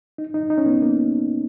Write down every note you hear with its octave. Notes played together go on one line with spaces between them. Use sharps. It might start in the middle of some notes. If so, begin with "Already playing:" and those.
D#4
D#4
D#4
C#4
B3
A#3